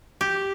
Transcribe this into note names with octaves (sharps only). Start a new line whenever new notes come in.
G4